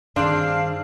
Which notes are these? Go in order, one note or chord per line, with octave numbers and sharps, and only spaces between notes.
G2 D#3 C4 D4 G#4 D5 F5